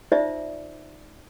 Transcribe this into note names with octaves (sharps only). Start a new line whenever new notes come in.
D#4 F4 C5 D5 E5